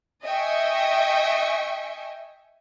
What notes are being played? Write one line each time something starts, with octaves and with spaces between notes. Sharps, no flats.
D#5 E5 G5 G#5 C#6